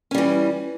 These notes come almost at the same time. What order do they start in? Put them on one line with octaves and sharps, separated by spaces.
C#4 G3 E3